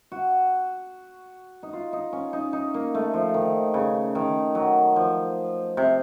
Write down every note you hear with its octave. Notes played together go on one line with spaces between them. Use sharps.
F#4
D#4
F4
D#4
C#4
D#4
D#4
A#3
A3
F3
D#3
C#3
D#3
F#3
F3
C3